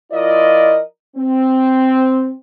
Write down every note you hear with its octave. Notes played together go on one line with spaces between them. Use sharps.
F3 E4 F4 A#4 D5 D#5
C4